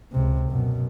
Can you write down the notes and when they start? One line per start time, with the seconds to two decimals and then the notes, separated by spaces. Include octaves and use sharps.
0.13 C#2 C3
0.50 F#2 B2